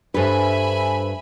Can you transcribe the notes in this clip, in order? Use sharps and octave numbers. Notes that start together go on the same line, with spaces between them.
G2 D4 A4 B4 C5 E5 G#5 B5